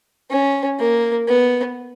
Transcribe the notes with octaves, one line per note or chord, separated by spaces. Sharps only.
C#4
A#3
B3